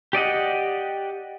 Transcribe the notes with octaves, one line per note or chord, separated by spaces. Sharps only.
G4 D5 D#5 F#5